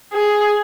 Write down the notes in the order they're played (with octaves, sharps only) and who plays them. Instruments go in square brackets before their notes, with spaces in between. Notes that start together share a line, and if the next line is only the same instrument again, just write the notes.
[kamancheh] G#4